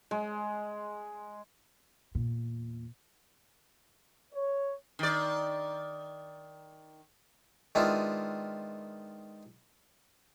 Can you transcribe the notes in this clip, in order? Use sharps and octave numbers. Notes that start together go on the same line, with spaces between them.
G#3
E2 A#2
C#5
D#3 D5
D#3 G#3 B3 D4 E4 F4